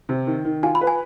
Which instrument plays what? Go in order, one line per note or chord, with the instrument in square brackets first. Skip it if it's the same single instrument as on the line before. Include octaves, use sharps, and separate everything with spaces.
[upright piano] C3
D#3
D#3
[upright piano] F4 [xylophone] G#5
[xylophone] B5
[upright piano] B4
[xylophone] G#5